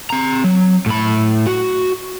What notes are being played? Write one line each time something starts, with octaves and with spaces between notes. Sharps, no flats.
C4 A#5
F#3
A2 B5
F#4